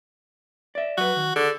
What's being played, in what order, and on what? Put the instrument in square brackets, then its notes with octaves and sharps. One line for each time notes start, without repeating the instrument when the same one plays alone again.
[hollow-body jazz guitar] D5 E5
[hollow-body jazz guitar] F#3 B4 [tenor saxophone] F#4
[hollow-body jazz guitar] D#3
[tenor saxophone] D3 [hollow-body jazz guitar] G#4